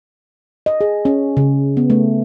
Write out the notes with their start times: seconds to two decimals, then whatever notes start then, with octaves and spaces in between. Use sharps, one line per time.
0.66 D#5
0.81 G#4
1.05 C#4
1.37 C#3
1.77 B3
1.90 A3